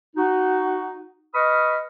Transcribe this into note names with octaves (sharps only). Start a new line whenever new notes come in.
D#4 F#4
B4 D#5 B5 C#6 D#6 F6